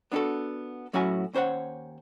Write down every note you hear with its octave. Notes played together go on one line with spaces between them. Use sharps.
B3 D4 D#4 F#4 A4
A2 F#3 C#4 E4 F#4 G#5
D#2 C#4 C5 C#5 F#5